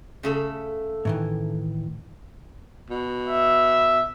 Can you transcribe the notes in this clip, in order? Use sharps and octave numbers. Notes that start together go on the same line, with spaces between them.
C#3 A3 A4
A2 D#3 E3
B2
E5